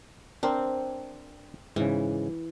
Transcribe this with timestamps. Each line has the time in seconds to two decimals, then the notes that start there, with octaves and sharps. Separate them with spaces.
0.43 C4 D4 A#4 C5
1.76 G#2 C#3 E3